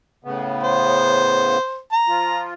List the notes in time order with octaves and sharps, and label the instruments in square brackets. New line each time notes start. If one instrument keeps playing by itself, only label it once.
[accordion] A2 C#3 B3
[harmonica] C5
A#5
[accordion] F3 F4